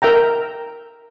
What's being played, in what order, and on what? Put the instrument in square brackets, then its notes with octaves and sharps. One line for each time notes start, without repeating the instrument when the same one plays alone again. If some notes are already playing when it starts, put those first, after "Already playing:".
[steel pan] A#4 E5 G5 A#5